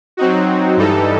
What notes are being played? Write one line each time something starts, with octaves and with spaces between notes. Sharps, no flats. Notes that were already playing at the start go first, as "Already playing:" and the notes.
F#3 C4 D#4 F#4
G2 E3 G3 D#4 A4